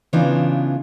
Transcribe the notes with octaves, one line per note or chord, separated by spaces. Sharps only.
C#3 E3 B3 D4 D#4 F4